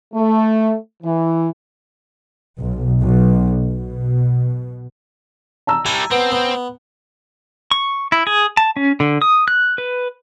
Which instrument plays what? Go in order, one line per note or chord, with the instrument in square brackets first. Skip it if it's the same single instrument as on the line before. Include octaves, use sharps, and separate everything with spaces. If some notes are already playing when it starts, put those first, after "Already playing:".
[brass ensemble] A3
E3
[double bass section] B1
B1
B2
[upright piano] A5 A#5 E6
[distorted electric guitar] G3 E4 [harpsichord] G#5
[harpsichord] B3 [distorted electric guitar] C4
[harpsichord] B3
[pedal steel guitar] C#6
E4
G#4
A5
C#4
D3
D#6
F#6
B4